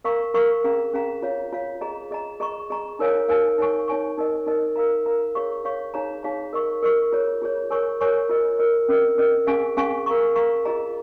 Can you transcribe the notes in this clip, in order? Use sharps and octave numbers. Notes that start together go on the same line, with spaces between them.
A#4 F5 A#5 C#6
A#4 F5 A#5 C#6
C#4 G#4 F5 A#5
C#4 G#4 F5 A#5
F4 C#5 F5
F4 C#5 F5
G#4 D#5 A#5
G#4 D#5 A#5
G#4 D#5 A#5 C#6
G#4 D#5 A#5 C#6
D#4 A#4 C#5 F5 G#5
D#4 A#4 C#5 F5 G#5
D#4 C#5 G#5 C#6
D#4 C#5 G#5 C#6
D#4 A#4 D#5
D#4 A#4 D#5
A#4 F5 A#5
A#4 F5 A#5
G#4 C#5 F5 C#6
G#4 C#5 F5 C#6
D#4 G#4 C#5 F5 A#5
D#4 G#4 C#5 F5 A#5
A#4 D#5 C#6
A#4 D#5 C#6
F4 G#4 C#5
F4 G#4 C#5
A#4 C#5 G#5 C#6
A#4 C#5 G#5 C#6
F4 A#4 D#5
F4 A#4 D#5
C#4 A#4 D#5
C#4 A#4 D#5
C#4 G#4 F5 G#5 C#6
C#4 G#4 F5 G#5 C#6
A#4 F5 A#5 C#6
A#4 F5 A#5 C#6
F4 G#4 D#5 A#5